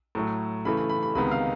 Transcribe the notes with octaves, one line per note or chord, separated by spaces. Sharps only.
A2 F#3 A3
C#3 E3 A3 B5
B5
B5
B5
C#2 C3 D#3 G#3 B3 B5
F5